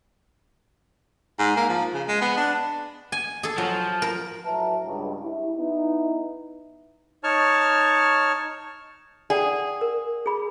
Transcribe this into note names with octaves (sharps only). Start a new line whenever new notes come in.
G#2
A#3
F3
C#3
G#3
B3
D4
G#5
G#4 A4
F3 F#3
A#4
A2 F#3 B4 E5 A5 A#5
C#2 G2
E4 G4
B3 D#4 E4
D#4 C#5 A5 C#6 F6
G#4 D5 F#5 G5
A#4
G#4 B5